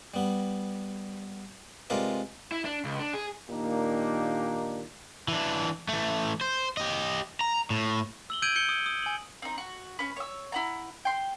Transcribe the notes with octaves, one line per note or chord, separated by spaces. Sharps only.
G3 B3
C3 G#3 F4 A#4 B4 D5
E4
D4
C#2
D4
G#4
A#2 D#3 A#3 D4 D#4 G4
E3 D4
E3 A3
C5
G4 D#5
A#5
A2
E6 F#7 G7
E6 G6 G#6 D7 D#7 F#7
G6 C#7 G7
D#6
D#6
G#5 F#7
C4 D#4
F#4
C#4 B4
C#5 E6
E4 F#5 A#5
G5 C6